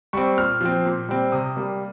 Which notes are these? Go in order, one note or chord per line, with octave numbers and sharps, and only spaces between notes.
G3 C4 C#6
A#2 F6
F3 C4
A#2
G3 C4
C3 D#6
G3 A#3